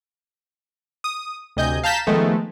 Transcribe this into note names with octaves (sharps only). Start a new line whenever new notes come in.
D#6
D2 C3 D#5 G#5 G6
F5 A5 A#5 G6 B6 E7
D#3 F3 G#3 A3 B3